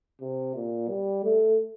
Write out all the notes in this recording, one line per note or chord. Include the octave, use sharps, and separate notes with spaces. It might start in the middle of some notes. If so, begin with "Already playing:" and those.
C3
A#2
G3
A3